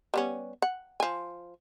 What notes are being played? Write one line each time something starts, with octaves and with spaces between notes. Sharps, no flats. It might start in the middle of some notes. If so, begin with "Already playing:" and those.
G3 B3 C#4
F#5
F3 G#5